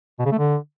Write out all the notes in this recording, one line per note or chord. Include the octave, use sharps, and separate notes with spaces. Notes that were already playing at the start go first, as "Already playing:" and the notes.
B2
C#3
A3
D3